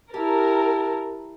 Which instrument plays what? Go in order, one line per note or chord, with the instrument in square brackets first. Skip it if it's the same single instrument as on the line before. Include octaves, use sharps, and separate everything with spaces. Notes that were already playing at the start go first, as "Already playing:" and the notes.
[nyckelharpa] E4 A5 [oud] G4 [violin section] A#4